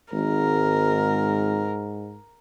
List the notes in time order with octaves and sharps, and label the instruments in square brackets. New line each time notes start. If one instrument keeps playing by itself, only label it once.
[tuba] G#1 [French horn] G#2 [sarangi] A#4